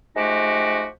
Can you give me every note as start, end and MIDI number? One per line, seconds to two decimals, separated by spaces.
0.16 0.86 53
0.16 0.86 56
0.16 0.86 57
0.16 0.86 63
0.16 0.86 66
0.16 0.86 67